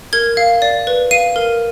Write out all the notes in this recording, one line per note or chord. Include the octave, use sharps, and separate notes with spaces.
A#4 G#6
F5
D5
B4
F5 D#7
A#4